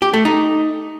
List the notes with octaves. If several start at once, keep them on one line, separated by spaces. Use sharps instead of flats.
G4
A3
D#4